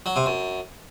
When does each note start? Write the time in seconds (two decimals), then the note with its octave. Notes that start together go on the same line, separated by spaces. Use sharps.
0.06 F#3
0.16 C3
0.26 F#2